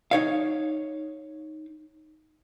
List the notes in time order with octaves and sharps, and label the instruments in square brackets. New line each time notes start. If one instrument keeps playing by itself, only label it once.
[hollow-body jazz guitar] D#4 C#5 F5